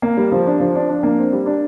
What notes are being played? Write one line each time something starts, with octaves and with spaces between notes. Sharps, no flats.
A#3
G3
F3
D4
F3
D4
D4
A#3
C4
G3
D4